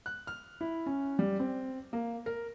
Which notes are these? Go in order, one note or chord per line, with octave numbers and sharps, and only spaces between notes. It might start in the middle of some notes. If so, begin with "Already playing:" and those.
F#6
F6
E4
C#4
G3
C4
A#3
A#4